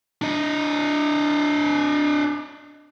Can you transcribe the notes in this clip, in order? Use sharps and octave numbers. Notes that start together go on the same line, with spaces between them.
D4 D#5